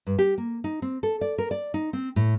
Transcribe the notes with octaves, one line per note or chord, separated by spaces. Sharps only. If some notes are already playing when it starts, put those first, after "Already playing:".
G2
G4
A#3
D#4
C4
A4
D5
A#4
D5
D#4
C4
A2